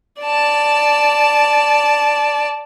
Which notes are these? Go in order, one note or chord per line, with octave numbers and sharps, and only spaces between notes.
D5 A5